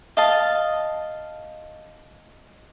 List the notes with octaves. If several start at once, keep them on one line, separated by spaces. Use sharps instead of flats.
D#5 F5 A5